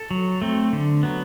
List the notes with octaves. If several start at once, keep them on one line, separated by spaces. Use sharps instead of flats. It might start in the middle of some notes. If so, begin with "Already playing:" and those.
Already playing: A4
F#3
A3 C4
D3
F#3 B3